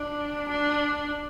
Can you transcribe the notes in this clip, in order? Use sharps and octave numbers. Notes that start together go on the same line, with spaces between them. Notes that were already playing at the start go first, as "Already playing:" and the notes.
Already playing: D4
D4